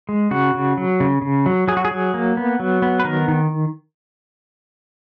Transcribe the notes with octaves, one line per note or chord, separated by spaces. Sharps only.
G#3
C#3 F#4
C#3
F#3
C#3
C#3
F#3
F#3 G#4
F#4
G#4
F#3
A#3
B3
F#3
B3
B4
D#3 A#4
D#3